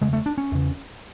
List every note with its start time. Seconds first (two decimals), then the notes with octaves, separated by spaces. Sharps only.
0.01 E2 C#3 G#3
0.13 A3
0.26 D4
0.38 C#4
0.51 E2 C#3